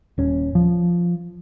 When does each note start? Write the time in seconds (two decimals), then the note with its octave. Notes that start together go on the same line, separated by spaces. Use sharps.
0.18 D#1 C#4
0.55 F3